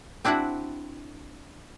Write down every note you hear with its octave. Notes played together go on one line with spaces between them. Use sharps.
C4 D4 E4 F#4 F#5